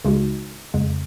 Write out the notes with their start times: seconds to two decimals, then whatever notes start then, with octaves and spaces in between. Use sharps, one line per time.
0.04 C#2 C#3 G#3 D#4 F#4
0.74 F2 C#3 G#3